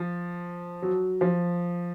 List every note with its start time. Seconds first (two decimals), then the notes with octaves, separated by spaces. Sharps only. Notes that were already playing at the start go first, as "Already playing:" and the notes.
Already playing: F3
0.82 F#3
1.21 F3